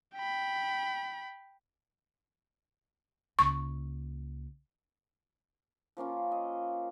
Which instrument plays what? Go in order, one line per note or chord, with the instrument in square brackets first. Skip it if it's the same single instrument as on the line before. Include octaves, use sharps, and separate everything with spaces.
[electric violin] G5 B5
[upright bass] C#2 A#3 [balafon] C#6
[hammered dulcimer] F3 A#3 C#4 F4
D#5